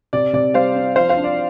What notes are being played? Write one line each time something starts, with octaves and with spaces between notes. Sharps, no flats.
C3 D5
C3 D5
G3 C5 F5
C4
F3 C5 F5
C5 F5
D4
D5